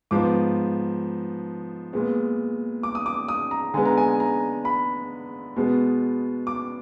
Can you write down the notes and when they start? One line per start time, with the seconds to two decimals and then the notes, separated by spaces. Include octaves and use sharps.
0.11 G#2 F3 B3 D6
1.93 A#2 G#3 B3
2.83 D6
2.95 D#6
3.06 D6
3.28 D#6
3.51 A#5
3.74 D3 G#3 B3 G#5
3.85 A#5
3.97 G#5
4.20 A#5
4.65 B5
5.56 B2 G#3 B3
6.47 D6